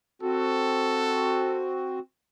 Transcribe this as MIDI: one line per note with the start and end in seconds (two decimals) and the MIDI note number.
0.22 1.99 60
0.22 1.99 66
0.22 1.64 69